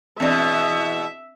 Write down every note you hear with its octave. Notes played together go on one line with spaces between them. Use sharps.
E2 B2 C4 D4 D5 E5